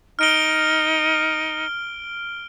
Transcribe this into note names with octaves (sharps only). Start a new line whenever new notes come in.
D#4 F6 D7 G7